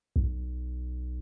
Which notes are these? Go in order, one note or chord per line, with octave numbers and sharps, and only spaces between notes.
B1